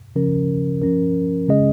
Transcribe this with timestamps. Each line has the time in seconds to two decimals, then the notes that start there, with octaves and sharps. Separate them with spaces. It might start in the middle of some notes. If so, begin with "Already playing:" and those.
0.16 C#3 F3 C#4 A#4
0.82 F3 C#4 A#4
1.48 C#3 G#3 C#4 G#4 D#5